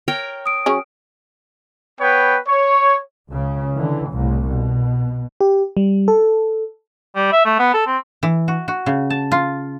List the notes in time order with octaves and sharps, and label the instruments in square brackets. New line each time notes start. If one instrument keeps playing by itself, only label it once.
[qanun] A#4 C#5 G5
[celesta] D#6 D7
[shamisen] F#3 C#4 G#4
[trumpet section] B3 B4 C#5 G5
C#5
[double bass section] C#2 C#3
D3 E3
C2 A2
B2
[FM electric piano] G4
G3
A4
[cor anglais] G3
E5
A3
B3
A4
C4
[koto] E3
F#4
F#4
C#3
A5
F4